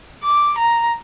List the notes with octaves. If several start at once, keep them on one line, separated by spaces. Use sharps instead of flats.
D6
A#5